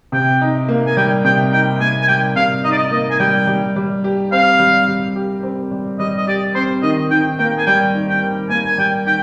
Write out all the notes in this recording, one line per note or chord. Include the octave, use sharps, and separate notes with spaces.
C3 G5
D#4
A#3
G#5
G3 G5
C3 G5
D#4 G5
A#3 G#5
G#5
G3 G5
C3 F5
D#4 D#5
D5
D#5
A#3 D#5
G#5
G3 G5
G3
G3
G4
C4 F5
G3
G3
G4
C4
G3
G3 D#5
D#5
G4 D5
C4 C5
D#3 D#5
D#3 G5
A#3 G5
G#5
G3 G5
D#3
G5
D#3
A#3 G#5
G#5
G3 G5
D#3 G5